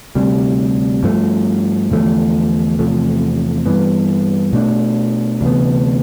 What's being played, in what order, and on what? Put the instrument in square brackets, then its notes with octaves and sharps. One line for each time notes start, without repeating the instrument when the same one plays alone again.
[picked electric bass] D2 C3 G3
G2 F3 A3
E2 D3 F3 A3
E2 C3 F3 A3
G2 E3 B3
B2 A3 D4
D2 C3 E3 B3